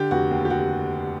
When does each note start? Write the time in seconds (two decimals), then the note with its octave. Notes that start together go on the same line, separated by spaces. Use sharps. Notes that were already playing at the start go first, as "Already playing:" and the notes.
Already playing: D3 G4
0.11 F1 F#4
0.31 D#2
0.45 G4
0.50 F#4